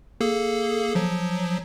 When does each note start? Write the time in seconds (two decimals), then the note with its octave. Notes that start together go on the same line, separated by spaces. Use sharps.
0.21 A#3 G#4 A4
0.95 F3 F#3